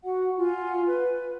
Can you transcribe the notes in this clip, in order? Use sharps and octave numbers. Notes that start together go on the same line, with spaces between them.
F#4 F#5
F4 F#5 G#5
B4